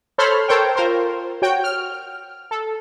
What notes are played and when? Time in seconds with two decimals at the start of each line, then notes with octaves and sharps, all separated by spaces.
0.18 A4 C5 C#5 B5 C6 F6
0.48 A4 A#4 C5 C#5 G5
0.76 F4 A#4 C5
1.42 F#4 C#5 G5
1.64 F6
2.51 A4